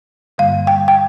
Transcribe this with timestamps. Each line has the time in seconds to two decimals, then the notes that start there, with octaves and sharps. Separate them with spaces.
0.38 G2 D3 G3 A#3 F5
0.67 G5
0.88 G5